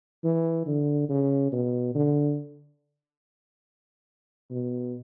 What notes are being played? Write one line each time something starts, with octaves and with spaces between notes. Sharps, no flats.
E3
D3
C#3
B2
D3
B2